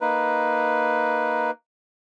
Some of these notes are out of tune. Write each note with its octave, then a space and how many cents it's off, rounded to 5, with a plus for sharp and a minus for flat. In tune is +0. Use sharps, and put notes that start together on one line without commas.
A#3 +0 D#4 +0 B4 +0